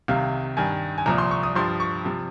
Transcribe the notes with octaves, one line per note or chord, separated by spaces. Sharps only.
C2 C3 D#3 F5
G2 D#3 G#5
G#5
C2 A#2 F3 A#5
C6
C#6
D#6
G2 F3 C6
C#6
C3 F3